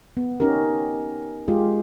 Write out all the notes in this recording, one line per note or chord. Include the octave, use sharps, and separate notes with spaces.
B3
C#4 D#4 G4 A#4
G#3 F4 G4 G#4